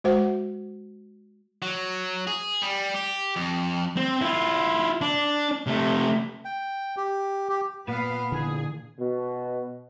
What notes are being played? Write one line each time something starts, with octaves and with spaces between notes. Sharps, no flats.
G#3 F#4 C5 F#5
F#3
G#4
G3
G4
F2
C4
E4 F4
D4
C3 A3
G5
G4
G4
A#2 B3 B4 F5
D3 E3 G#4
B2